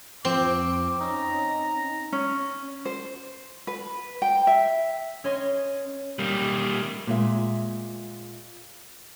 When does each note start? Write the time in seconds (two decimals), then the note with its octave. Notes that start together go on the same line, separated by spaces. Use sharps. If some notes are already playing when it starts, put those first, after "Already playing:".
0.25 F2 F3 C4 D6
1.01 C#4 D#4 A#5
2.12 C#4
2.85 C5
3.67 B4
4.22 G5
4.47 E5
5.24 C#4 C#5 D#5 C6
6.19 G3 A#3
7.07 A#2 G#3 E5